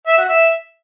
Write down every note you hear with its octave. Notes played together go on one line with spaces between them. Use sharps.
E5
F#4
E5